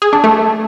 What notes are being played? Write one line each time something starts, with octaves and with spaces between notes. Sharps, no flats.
G#4
D4
A3